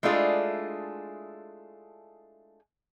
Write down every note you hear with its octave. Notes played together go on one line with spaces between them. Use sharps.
G#3 A3 D4 E4 F4 G#4